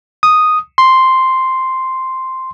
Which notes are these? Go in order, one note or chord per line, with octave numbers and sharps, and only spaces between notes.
D#6
C6